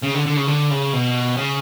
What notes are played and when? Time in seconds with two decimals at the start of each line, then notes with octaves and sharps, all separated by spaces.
0.02 C#3
0.14 D3
0.26 D3
0.37 C#3
0.47 D3
0.70 C#3
0.93 B2
1.37 C#3